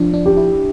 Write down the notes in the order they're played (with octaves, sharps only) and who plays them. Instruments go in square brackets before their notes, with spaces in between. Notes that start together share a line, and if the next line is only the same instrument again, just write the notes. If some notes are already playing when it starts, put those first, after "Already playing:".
Already playing: [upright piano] F3 [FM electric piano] D4
[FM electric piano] D4
[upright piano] G4
[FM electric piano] E4